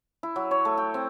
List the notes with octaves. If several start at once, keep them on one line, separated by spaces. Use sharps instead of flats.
E4
F#3
C#5
A3
G5
C4